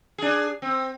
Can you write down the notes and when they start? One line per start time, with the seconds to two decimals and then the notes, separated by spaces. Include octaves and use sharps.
0.18 D4 G#4
0.62 C4